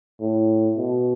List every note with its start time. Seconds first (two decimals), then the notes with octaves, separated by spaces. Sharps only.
0.21 A2
0.77 B2